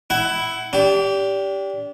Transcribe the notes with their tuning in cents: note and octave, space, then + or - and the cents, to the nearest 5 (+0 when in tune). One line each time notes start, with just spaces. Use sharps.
E4 +0 F#5 +20
D4 -30 G4 +0